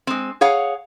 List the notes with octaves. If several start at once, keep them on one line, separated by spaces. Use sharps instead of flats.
G#3 C4
G#4 C#5 F5 F#5